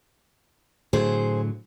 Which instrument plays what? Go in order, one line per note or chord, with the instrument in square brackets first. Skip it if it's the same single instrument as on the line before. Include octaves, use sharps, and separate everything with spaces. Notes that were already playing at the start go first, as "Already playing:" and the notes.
[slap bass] A2 D3 F#3 [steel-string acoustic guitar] G#4 C5